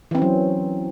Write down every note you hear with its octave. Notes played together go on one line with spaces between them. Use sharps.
E3 F#3 C4 C#4